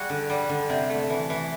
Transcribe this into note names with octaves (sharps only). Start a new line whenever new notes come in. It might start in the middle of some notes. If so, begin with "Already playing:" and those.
Already playing: G3 F#4 G#4
D3
G3
D3
C3
A3
E3
E3